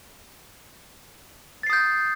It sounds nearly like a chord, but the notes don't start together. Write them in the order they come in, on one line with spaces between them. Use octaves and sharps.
A6 C7 D#6 G6